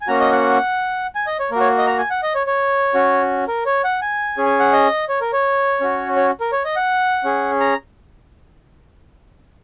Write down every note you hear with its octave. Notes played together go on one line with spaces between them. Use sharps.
G#5
A#3 C#4 F#4 A#5
D#5
F#5
G#5
D#5
C#5
A#3 F#4 A#4 C#5
D#5
A#5
G#5
F#5
D#5
C#5
C#5
C#4 F#4
A#4
C#5
F#5
G#5
C#4 G#4
G#5
F#5
D#5
C#5
A#4
C#5
C#4 F#4
C#5
A#4
C#5
D#5
F#5
C#4 G#4
A#5